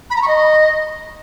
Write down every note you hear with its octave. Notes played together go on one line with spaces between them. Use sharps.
B5
A#5
C#6
D#5